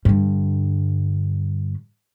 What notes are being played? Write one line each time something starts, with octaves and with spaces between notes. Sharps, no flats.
G2 D3